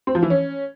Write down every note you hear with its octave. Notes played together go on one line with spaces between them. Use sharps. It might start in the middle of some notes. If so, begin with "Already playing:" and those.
C4
F3
E3
C#4